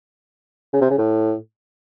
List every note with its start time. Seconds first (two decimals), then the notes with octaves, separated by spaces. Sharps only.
0.73 C#3
0.81 C3
0.90 C#3
0.98 A2